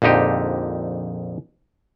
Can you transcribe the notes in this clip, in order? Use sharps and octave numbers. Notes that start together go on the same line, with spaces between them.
A#1 F2 D3 D#4 G4